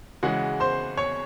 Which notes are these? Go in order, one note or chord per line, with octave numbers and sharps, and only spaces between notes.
C#3 E3 G#3 F#4 F#5
C5 C6
C#5 C#6